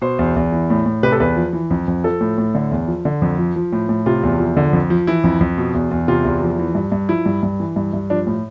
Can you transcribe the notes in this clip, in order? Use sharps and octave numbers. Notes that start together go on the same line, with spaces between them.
B2 C5
E2
E2
E3
A2
A2
C3 B4
A4
E2 B4
F3
E3
F2
F2
F3 A4
A2
A2
D3
E2
F3
D3
F2
F3
F3
A2
A2
C3 F4
E2
F3
D3
F2
F3
E3 E4
F2
F2
B2
E2
E2
C3 F4
E2
F3
E3
G2
G2
F3 E4
G2
G2
E3
G2
G2
F3 D4
A2